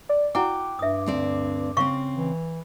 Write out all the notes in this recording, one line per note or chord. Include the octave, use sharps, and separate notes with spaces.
D5
E4 F#4 F#5 G5 D6
G2 E5 D#6
D2 C4 D5
C#3 C4 F5 C#6
E3